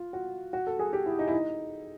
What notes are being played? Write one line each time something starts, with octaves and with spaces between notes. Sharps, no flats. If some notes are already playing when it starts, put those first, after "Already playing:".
Already playing: F4
F#4
F#4
A4
G#4
G4
E4
D#4
E4
D#4